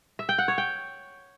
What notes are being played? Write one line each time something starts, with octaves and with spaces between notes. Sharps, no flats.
E5
G5
F#5
C#5
G5